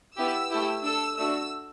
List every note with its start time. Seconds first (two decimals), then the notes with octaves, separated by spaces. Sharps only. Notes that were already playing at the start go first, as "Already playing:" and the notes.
0.16 B3 E4 G4 E6
0.50 A3 E4 G4
0.83 D4 A4 E6
1.17 A3 D4 F#4 E6